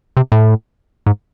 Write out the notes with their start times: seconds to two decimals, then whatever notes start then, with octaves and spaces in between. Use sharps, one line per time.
0.17 C3
0.32 A2
1.06 G#2